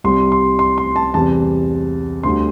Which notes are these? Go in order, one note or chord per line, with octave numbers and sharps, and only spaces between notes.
C2 C3 G3 C6
C6
C6
C6
A5
E2 C3 G3 A5
D2 D3 G3 C6